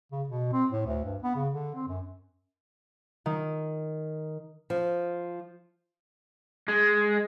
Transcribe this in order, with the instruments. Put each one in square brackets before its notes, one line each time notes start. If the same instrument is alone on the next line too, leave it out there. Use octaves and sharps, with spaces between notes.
[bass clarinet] C#3
B2
C4
A2
D2
G2
B3
C#3
D3
C4
F#2
[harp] D#3
[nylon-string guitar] F3
[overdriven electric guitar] G#3